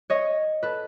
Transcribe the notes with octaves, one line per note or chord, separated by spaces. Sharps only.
C#5 D#5
A4 B4